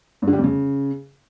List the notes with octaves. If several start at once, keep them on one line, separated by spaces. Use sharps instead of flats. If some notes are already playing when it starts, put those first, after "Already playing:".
G2
D3
G3
F2
C#3